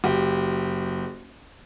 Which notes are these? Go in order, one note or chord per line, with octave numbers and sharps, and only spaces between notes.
F#1 G4